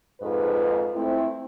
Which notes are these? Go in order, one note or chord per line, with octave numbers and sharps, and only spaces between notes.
F2 G#2 B4
A3 C4 E4